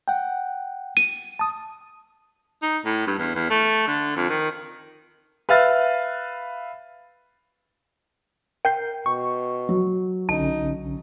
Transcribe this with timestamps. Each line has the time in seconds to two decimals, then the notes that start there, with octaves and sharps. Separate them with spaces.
0.08 F#5 G5
0.97 D#7
1.39 A5 D#6
2.62 D#4
2.85 A2
3.07 G2
3.19 E2
3.35 E2
3.50 A3
3.87 D3
4.16 F2
4.29 D#3
5.49 B4 E5 F5 F6 A6
8.65 A#4 G5 G6 C7
9.06 B2 C#6
9.69 F#3
10.29 B1 D3 C#4 D#4 A5